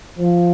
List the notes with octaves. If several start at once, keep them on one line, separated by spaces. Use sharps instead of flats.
F3